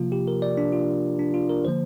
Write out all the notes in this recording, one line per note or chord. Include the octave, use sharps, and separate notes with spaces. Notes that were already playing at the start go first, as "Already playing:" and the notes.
Already playing: C3 F3 A#3 F4
G4
A#4
D5
D4
F4
D4
F4
A#4
D3 F3 A#3 C5